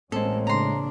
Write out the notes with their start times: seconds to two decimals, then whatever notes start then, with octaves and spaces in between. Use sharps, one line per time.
0.12 A1 A2 G#3 A#3 C4 C#4 A4
0.47 C#3 D4 A#5 C6